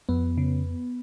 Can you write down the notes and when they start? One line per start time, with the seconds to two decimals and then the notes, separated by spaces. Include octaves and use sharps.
0.09 F2 B3
0.38 C#3